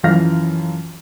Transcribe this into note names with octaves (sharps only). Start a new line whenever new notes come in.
F#2 E3 F3 F5 F6 A#6